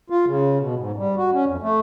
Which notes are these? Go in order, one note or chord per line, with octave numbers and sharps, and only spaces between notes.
F4
C#3
B2
G#2
G3
F#4
C#4
F2
A3